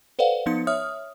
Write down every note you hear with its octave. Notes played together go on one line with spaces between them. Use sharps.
A4 B4 C5 D5 F5 F#5
F3 B3 D#4 C6 C#7
C#5 E5 D#6 F6